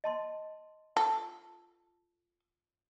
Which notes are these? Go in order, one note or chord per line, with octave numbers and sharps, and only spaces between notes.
D#5 A5 C6
F4 A4